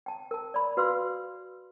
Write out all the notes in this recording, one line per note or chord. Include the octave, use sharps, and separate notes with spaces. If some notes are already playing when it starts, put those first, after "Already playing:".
G5 A5
A#4 A5
D5 B5
F#4 B4 F5 C6 E6